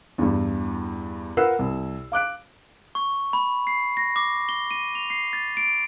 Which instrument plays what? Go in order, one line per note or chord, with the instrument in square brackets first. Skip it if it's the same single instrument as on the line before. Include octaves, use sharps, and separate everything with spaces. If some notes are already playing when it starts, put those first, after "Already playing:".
[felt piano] E2 G2
F4 A#4 B4 F#5 E6 C7
C2
F5 D6 F#6 D7
[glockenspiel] C#6
B5
C7
A#6
D6
G7
D#7
F7
C7
A6
D7